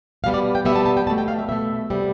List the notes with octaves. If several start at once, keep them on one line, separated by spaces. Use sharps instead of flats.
B2 G3 B3 F5
D5
G5
B2 G3 B3 E5
A5
A5
G5
B2 A3 A5
G5
F5
E5
B2 A3 E5
C3 G3 B3